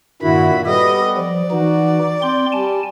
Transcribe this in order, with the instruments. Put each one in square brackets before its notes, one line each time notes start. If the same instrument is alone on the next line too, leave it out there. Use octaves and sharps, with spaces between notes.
[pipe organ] G2 D#3 [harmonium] A#2 E4 F#4 [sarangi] B5
[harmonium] G3 B3 [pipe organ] G4 A4 [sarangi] D#5
[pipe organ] F3 [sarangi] D5
[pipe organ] E3 D#4 [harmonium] F#4
[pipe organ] C4 C6 [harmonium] G5
[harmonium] G3 [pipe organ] G#5 A5